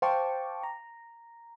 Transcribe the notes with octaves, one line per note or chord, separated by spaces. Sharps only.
C5 F5 G5 A5 C#6 D6
A#5